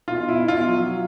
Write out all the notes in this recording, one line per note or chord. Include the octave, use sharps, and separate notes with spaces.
B2 F4
E4
B2
F4
F#3